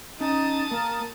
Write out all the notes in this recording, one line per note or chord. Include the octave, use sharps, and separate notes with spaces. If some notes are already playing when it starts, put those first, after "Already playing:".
C#4 D#4 A5 D#6
A#3 A#4